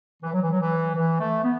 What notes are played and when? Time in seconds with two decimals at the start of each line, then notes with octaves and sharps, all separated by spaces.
0.23 E3
0.33 F#3
0.42 E3
0.51 F#3
0.61 E3
0.96 E3
1.20 A3
1.44 B3